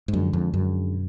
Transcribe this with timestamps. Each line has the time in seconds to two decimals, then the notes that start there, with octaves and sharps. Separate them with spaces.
0.08 G#2
0.13 F#2 D3 F3 G#3 D4 G#4
0.33 F2
0.54 F#2
0.93 B2